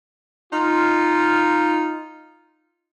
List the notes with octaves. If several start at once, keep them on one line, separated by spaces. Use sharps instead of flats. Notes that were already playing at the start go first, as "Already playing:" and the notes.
D#4 F4